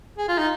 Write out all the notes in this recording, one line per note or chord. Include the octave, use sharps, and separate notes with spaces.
G#4
F4
D#4